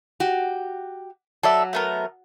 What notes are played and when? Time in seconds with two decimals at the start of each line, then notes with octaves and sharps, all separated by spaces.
0.20 F#4 G4
1.43 F#3 A4 D5 E5
1.73 A3 B3 A#4